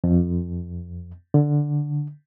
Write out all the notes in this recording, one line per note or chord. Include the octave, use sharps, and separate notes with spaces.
F2
D3